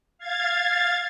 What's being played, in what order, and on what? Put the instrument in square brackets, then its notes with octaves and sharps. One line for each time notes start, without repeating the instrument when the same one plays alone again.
[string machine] F5 G#6 A6